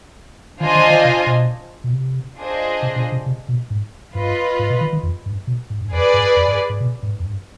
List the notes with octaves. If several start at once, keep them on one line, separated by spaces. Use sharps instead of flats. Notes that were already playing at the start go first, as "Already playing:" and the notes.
D#3 D4 F4 C5 D#5 G#5
D#3
D#3
C3
B2
B2
C3
D4 F4 G#4 C5 D#5
C3
B2
C3
C3
B2
G#2
G2 F4 B4 D#5
G#2
B2
D#3
D#3
F2
G2
B2
G#2
G2
F2 G#4 B4 D5
G2
F2
G2
G#2
B2
G#2
F2
G2